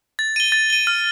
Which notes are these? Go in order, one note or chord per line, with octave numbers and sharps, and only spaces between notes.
A6
D#7 G7
A6
D#7 G7
F6